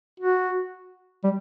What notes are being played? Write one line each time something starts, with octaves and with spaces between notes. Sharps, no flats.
F#4
G3